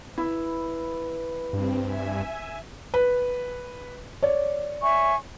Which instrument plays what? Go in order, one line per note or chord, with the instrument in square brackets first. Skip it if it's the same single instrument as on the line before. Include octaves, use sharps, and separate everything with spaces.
[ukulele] E4 [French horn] B4
[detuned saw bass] G2 [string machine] C4
[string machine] E5 G#5
[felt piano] B4
C#5 D5
[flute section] E5 G#5 C#6